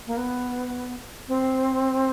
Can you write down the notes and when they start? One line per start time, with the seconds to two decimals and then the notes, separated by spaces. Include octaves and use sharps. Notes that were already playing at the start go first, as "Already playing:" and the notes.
0.07 A#3
0.17 B3
1.28 C4